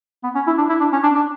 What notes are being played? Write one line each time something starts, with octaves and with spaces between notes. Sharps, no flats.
B3
C#4
E4
D4
E4
D4
C#4
D4
D4